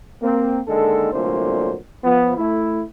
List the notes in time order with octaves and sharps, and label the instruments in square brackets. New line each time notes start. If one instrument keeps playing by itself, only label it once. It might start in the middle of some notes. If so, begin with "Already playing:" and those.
[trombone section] A#3 C4
D3 D#3 G#3 A#3 A4
C2 A#2 D3 F#3 A3 C5
F3 B3
A3 E4